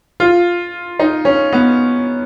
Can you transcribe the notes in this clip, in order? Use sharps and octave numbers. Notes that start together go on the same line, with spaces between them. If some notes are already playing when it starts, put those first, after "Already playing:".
F4
D#4
C#4
B3